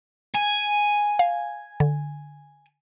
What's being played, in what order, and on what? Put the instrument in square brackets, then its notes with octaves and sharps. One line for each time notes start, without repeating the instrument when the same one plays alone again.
[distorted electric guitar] G#5
[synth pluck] F5
D3